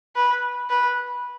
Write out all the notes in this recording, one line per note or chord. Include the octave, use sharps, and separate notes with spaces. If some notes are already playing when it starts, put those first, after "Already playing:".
B4
B4